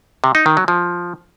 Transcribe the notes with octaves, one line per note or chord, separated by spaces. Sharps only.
C3
D#4
D#3
F#3
F3